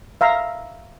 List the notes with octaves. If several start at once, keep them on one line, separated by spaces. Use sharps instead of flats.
E5 F5 A#5